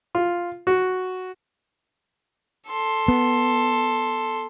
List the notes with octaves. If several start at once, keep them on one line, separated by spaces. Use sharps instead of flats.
F4
F#4
A4 C6
B3